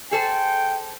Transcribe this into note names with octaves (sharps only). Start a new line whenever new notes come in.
G#4 A4 C5 G5